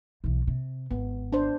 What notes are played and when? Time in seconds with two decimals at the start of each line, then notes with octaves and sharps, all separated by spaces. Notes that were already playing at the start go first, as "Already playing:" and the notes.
0.24 B1 E3
0.47 C3
0.91 G#1 B3
1.33 D4 C5